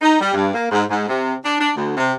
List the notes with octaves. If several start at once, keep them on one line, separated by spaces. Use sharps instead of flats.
D#4
G3
G2
A#3
G#2
G#2
C3
D4
D4
D2
C3